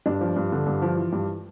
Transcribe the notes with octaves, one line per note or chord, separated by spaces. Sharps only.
G2 D4
F3
G2
D3
G2
F3
E3
G2